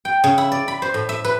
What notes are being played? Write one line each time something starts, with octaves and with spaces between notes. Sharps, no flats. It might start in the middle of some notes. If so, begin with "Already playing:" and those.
G5
C#3
E4
D5
B5
C5
A2
E5
B4